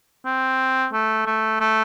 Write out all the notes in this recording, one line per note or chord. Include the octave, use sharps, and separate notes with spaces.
C4
A3
A3
A3